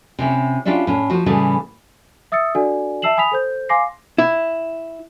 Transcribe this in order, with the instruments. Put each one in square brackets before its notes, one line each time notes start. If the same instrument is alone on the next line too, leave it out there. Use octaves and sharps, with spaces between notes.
[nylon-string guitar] C3 C#4 E4
C#4 D4 E4 F4 G4
A2 C#4
F3 F#4
A2 C#3 E3 G3 A3
[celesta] E5 D#6 E6 A6 C#7
D4 F#4 A4 D5 F#5 G#5
E5 A5 E6 C7 E7 F#7
G#5 B5 D#6 B6 F7
A4 C5 G6
F5 G#5 C6 D6 A#6 C7
[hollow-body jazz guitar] E4